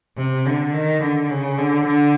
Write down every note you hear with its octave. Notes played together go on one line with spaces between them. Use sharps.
C3
D3
D#3
D3
C#3
D3
D3